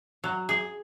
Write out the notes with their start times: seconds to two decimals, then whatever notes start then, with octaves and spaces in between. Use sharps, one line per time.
0.24 F#3
0.49 G#4